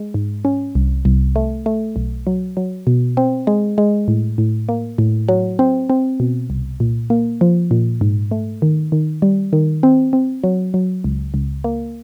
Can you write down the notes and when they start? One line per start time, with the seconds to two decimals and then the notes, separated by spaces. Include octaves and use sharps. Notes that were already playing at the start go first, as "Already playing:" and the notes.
Already playing: G#3
0.14 G#2
0.45 C#4
0.75 C2
1.05 C2
1.36 A3
1.66 A3
1.96 B1
2.27 F#3
2.57 F#3
2.87 B2
3.17 C4
3.47 G#3
3.78 G#3
4.08 A2
4.38 A2
4.69 A#3
4.98 A2
5.28 F#3
5.59 C4
5.90 C4
6.20 B2
6.50 C2
6.80 A#2
7.10 A#3
7.41 F3
7.71 A#2
8.01 G#2
8.31 A3
8.62 D#3
8.92 D#3
9.22 G3
9.53 D#3
9.83 C4
10.13 C4
10.43 F#3
10.74 F#3
11.04 C#2
11.34 C#2
11.64 A#3